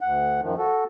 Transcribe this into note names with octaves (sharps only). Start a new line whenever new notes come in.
D2 F#5
F#2 D#3 F3
F#4 A4